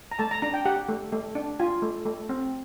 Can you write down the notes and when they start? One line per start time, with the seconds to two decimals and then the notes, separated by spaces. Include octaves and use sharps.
0.12 A#5
0.19 A3 A5
0.31 A#5
0.42 D4 A#5
0.54 G5
0.65 G4 F#5
0.89 A3
1.12 A3
1.35 D4
1.60 F4 G#5
1.82 A3
2.06 A3
2.29 C4